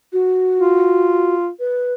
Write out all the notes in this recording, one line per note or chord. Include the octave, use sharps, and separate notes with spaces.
F#4
F4
B4